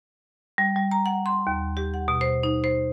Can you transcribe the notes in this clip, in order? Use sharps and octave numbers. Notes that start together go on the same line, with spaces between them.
G3
G3
A#5
F#5
C6
D#2
G4
F#5
B2
C5
D#4
C5